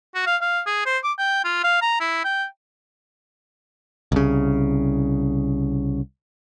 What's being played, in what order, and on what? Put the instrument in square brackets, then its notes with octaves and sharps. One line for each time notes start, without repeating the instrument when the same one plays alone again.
[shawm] F#4
F5
F5
G#4
C5
D6
G5
F4
F5
A#5
E4
G5
[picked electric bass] C2 C#3